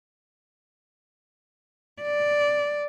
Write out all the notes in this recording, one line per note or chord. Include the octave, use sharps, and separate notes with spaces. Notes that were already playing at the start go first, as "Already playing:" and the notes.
D5